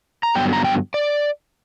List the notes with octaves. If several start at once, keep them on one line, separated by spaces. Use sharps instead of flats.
A#5
G2 D3 F#3 B3 G5
A#5
G5
D5